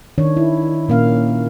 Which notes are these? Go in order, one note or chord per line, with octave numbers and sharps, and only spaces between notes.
D#3 D4 C#5
E4
A#2 A#3 C#4 F5